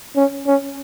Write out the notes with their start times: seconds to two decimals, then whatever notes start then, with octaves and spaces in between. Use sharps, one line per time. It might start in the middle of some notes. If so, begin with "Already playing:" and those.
0.16 C#4
0.47 C#4